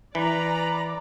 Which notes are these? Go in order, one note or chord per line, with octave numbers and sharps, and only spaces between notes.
E3 B4 D5 A#5 B5